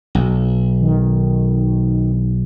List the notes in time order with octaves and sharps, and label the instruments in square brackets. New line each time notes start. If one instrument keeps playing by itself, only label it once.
[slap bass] B1
[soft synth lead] D#3